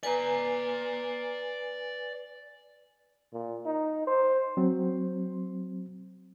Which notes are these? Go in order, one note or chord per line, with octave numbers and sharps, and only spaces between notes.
B4 D5 G#5 A#5
A#2
D#4
C5
F#3 C4